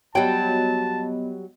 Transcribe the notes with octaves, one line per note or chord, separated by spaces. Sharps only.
F#3 G3 B3 D#5 G5 A5